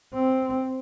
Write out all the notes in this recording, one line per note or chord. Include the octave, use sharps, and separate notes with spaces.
C4